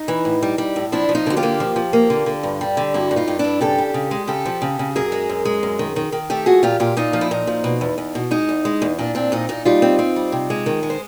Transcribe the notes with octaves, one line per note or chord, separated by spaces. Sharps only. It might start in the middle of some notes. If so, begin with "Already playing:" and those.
Already playing: D#4
E3
A2
G3
G3
A2
F3 D4 E4
F3
D#4 F4
D3 F#4
F4 G4
A#3
F3
F3
A#3
D3
D3
G2
G3
D3
G2 E4 F#4
G2
D#4 F4
G2
G2 D4 E4
C#3 G4 A4
C#3
C#3
G#3
C#3 G4 A4
F3
C#3
C#3
F#2 G#4 A#4
G#3
F#2
G#3
F#2
D#3
D#3
D#3
A3 G4 A4
F3 F#4 G#4
A#2 F4 G4
A#2 F4 G4
A#2 D#4 F4
F3
E4
A#2 D#4
F3
B2
E2
E2
B2
G#3 D#4
E2
G#3
E2
A#2 D4
C4 D4
A#2 D#4
A#2 D#4
G3 D#4 F4
C4
C4
G3
C3
G#3
D#3
G#3
C5